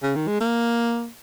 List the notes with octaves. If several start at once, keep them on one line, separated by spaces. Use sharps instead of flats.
C#3
D#3
G#3
A#3